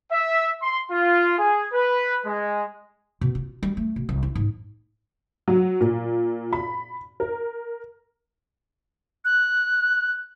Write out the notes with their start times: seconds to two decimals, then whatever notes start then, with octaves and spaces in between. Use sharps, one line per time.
0.12 E5
0.62 C6
0.91 F4
1.38 G#4
1.73 B4
2.25 G#3
3.21 B2
3.35 F4
3.63 G3
3.77 A3
3.96 B2
4.09 C2
4.23 E4
4.35 G#2
5.48 F#3
5.81 A#2
6.53 B5
7.20 A#4
9.25 F#6